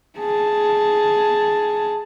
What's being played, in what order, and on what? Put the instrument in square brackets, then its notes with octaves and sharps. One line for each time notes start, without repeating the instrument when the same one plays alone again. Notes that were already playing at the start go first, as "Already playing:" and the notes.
[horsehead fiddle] G#4 A5